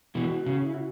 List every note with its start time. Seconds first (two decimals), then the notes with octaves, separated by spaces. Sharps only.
0.15 B2 E3 F#4
0.46 C#3
0.62 E4
0.74 F#4